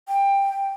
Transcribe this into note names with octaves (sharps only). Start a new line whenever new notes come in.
G5